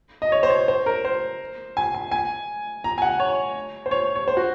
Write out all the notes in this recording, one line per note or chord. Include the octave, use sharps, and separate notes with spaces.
D#5
C#5
C5
C#5
C5
A#4
C5
G#5
G#5
G#5
A#5
G#5
F#5
C#5
C5
C#5
C#5
C5
F#4